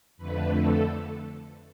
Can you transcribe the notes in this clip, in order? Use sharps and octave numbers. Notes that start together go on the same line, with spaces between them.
F2 D3 A3 B4
A4